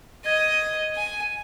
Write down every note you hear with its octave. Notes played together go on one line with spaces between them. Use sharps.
D#5 G#6
G#5